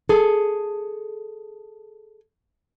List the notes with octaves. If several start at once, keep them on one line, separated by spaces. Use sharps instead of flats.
G#4 A4